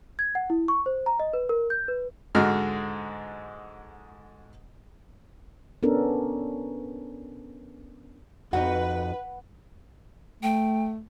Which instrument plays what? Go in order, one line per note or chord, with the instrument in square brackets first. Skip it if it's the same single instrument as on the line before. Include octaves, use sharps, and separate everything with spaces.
[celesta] G#6
F#5
E4
C#6
C5
A#5
D#5
B4
A#4
G6
B4
[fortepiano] G#2 D3 G#3 F#4 F6
[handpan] B3 C#4 D4 A4 A#4
[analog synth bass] F2 [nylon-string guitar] D#4 F#4 [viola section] B4 [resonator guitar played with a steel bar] F#5
[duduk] A3 [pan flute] G5